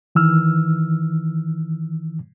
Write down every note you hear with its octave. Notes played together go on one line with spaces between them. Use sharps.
D#3 E3 E6 F6